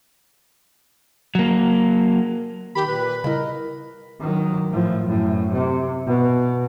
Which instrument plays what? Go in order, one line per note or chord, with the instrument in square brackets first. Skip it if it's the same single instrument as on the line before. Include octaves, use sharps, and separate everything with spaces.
[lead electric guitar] F#3 A#3
[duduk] D#3 [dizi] G4 [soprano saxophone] B5
[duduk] A#2 [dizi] B4
[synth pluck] C#3 G3 E4 [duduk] A#4 [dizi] D#5
[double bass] D#3 F#3
A2 F3
F#2 A2
C3
B2